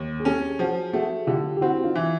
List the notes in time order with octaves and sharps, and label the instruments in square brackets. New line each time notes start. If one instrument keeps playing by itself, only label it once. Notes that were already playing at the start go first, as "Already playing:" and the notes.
Already playing: [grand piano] D#2
[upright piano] G#4
[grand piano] C#4 [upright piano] G4 A4
[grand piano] F3 [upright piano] F#4 G#4
[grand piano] A3 [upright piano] F#4 G#4
[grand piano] D3 [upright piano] F4 G4
[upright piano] G4
[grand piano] C4 [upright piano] E4 F#4
[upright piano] D#4 F4
[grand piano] E3